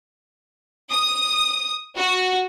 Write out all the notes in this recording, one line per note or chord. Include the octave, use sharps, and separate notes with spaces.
D#6
F#4